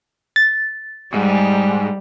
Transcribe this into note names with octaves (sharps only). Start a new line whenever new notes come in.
A6
G#2 G3